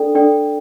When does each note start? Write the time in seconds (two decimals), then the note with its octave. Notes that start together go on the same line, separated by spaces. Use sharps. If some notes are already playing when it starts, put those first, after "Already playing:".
Already playing: D4 A4 D5 G5
0.15 D4 A4 D5 G5